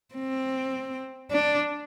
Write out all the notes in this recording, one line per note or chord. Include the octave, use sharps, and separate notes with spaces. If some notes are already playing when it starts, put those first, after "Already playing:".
C4
D4